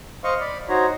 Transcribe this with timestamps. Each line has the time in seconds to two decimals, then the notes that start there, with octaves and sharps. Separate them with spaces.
0.24 C5 D#5 F5 C#6
0.40 D5 B5
0.69 D#4 F#4 C5 C#5 A#5